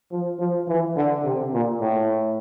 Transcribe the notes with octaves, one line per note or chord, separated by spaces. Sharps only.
F3
F3
E3
D3
C3
A#2
A2